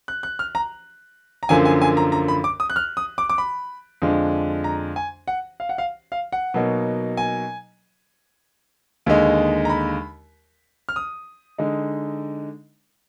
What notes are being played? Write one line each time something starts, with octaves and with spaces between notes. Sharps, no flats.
F#6
F#6
F6
A#5
A#5
F#2 D3 F3 A#3 G#5
G#5
G#5
A#5
A#5
B5
D6
D#6
F#6
F6
D#6
D6
D6
B5
F2 D3 G#3 D4
A#5
G#5
F#5
F5
F#5
F5
F5
F#5
B2 F#3 A#3 D#4
G#5
D#2 D3 G#3 D#4
A#5
B5
F6
D#6
D3 G#3 D#4